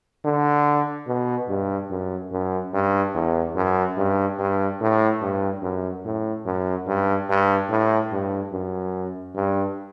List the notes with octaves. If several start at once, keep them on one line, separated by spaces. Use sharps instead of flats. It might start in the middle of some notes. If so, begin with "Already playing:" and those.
D3
B2
G2
F#2
F#2
G2
E2
F#2
G2
G2
A2
G2
F#2
A2
F#2
G2
G2
A2
G2
F#2
G2